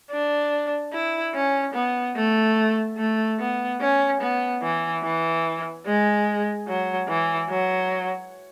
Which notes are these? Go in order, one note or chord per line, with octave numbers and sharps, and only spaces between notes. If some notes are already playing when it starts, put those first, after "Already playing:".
D4
E4
C#4
B3
A3
A3
B3
C#4
B3
E3
E3
G#3
F#3
E3
F#3